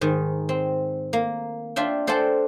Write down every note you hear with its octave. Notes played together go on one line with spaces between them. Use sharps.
G#2 D#3
C4
A#3
D4 F4 E5 G5
A4 C5 D5 F#5 G5 A5